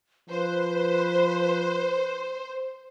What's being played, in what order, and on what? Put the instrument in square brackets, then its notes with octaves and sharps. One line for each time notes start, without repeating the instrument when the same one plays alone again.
[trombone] F3 [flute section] B4 [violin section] C5